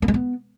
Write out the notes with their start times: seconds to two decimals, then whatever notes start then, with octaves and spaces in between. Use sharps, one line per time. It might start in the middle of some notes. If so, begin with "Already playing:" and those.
0.02 A#3
0.08 G#3
0.14 B3